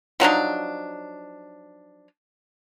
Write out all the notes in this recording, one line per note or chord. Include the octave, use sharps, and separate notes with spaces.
F3 F#3 D4 D#4